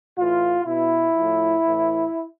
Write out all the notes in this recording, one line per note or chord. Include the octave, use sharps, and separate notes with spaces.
A2 E3 F4
B2 E4
A2 F3
A2 E3